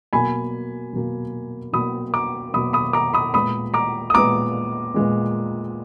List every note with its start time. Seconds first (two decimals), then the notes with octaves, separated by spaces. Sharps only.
0.13 B2 F#3 A#3 G#5 B5
0.93 B2 F#3 A#3
1.73 B2 F#3 A#3 B5 D#6
2.14 A#5 D6
2.54 B2 F#3 A#3 B5 D#6
2.73 B5 D#6
2.93 A#5 D6
3.14 B5 D#6
3.34 A#2 G#3 B3 B5 D#6
3.74 A#5 D6
4.10 D#6
4.14 A#2 G#3 B3 A#5 D6
4.94 A#2 G#3 B3